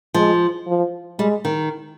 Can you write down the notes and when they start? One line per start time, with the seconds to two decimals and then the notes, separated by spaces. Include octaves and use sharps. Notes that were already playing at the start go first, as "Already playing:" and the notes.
0.14 F3 G#3
0.67 F3
1.19 G3 G#3
1.45 D#3